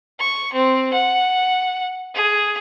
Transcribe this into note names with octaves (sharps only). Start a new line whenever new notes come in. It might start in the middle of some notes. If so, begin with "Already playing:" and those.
C#6
C4
F#5
G#4